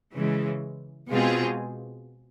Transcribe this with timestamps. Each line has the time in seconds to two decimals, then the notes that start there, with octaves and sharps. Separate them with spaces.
0.14 C#3 E3 G#3
1.09 B2 G#3 C4 F4 G#4